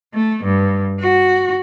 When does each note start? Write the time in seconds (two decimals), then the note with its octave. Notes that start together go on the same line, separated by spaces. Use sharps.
0.14 A3
0.44 G2
1.01 F#4